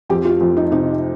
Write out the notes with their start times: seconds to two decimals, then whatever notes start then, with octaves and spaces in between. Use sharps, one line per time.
0.09 F2 G4
0.25 F4
0.40 F2
0.57 D#4
0.72 C3 D#4